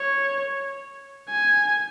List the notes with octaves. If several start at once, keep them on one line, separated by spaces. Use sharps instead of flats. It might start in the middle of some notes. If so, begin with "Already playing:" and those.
Already playing: C#5
G#5